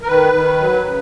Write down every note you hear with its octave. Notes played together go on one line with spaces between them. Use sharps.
A#4
D#3 B4
D#3
F#3
C#3